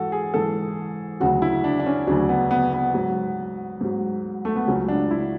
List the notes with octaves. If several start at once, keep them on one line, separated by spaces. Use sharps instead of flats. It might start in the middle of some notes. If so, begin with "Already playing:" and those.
Already playing: G#2 E3 F#4 A4
G#4
G#2 E3 A4
D2 C#3 F#3 F#4
E4
D4
D4
C#4
D2 C#3 F#3 D4
B3
B3
B3
G#2 F#3
G#2 F#3
A3
B3
C#2 C#3 F#3 C#4
D4
E4